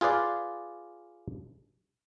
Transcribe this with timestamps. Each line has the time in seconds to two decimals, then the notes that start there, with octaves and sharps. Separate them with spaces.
0.01 F4 G#4 B4 D5 F5